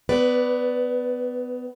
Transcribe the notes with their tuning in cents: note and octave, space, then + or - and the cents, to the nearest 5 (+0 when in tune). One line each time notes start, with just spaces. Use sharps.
B3 +25 B4 +0 D5 +0